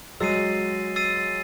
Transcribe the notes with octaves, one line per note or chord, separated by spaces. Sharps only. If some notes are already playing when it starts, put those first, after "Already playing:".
F#3 G#3 E6 A6 C7 D#7
E6 A6 C7 D#7